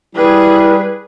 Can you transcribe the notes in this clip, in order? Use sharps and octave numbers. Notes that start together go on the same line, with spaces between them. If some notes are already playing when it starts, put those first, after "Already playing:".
G3 E4 G#4 B4